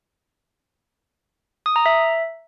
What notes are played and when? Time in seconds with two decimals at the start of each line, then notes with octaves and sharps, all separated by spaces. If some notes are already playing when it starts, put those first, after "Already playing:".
1.66 D#6
1.76 A#5
1.86 E5